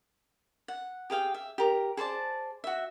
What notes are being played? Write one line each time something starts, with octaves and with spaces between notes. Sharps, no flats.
F#5
G4 G#4 F5 G5
E5
G4 A#4
G#4 C5 D5 A5
F#4 E5